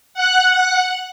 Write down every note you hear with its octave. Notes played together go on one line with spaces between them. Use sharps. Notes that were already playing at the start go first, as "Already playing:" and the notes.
F#5 F#6